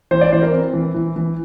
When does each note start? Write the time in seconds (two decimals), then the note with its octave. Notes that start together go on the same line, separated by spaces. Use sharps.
0.11 E3 C5
0.21 D5
0.32 E3 C5
0.42 A#4
0.53 C4
0.73 E3
0.94 E3
1.16 E3